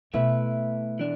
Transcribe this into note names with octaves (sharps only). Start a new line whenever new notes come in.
B2 A3 E4 B4 E5
E3 D4